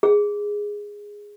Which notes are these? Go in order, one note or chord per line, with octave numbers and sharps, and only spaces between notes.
G#4